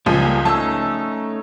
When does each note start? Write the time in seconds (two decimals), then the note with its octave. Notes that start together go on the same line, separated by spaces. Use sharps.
0.06 C#2 F3 G3 A#3 G#4
0.45 A3 C#4 D#4 A5 E6